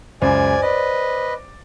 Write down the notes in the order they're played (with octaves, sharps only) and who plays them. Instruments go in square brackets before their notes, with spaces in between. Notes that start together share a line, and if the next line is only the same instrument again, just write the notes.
[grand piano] C#2 F#2 C#3 [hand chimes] C5 [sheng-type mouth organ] D5 G#5
[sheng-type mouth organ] B4 D#5 [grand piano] D5